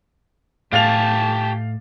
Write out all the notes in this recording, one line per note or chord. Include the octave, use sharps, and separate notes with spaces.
A2 A3 G4 F5 G#5 A5 A6 F7